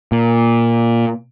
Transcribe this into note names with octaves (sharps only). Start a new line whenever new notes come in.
A#2